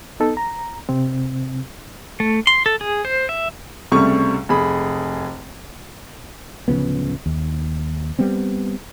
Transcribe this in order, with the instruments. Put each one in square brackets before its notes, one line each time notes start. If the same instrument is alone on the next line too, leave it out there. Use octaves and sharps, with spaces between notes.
[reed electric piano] B3 D#4 A4
A#5
C3 C4
[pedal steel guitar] A3
C6
A4
G#4
C5
E5
[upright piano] C#2 C3 G3 A3 C#6
F1 G#4 B5
[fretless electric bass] D1 C#3 F3 B3
D#2
G3 B3 C4